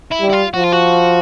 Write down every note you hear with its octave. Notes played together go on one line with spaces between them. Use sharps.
E4
G3
E4
F4
F3 F#4
F4
F#4